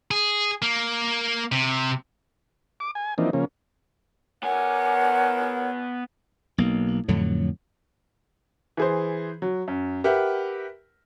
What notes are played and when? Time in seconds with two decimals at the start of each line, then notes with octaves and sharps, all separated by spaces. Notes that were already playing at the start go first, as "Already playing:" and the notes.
0.11 G#4
0.62 A#3
1.52 C3
2.80 D6
2.95 G#5
3.18 E3 F3 A#3 C4 D4 D#4
3.33 C#3 F3 A#3 C#4
4.43 B3 A#4 C#5 F#5 G#5
6.58 B1 A#3
7.08 F2 A2 D3 F#3
8.77 E3 G#4 C5
9.42 F#3
9.68 F#2
10.04 G4 A#4 B4 E5 F#5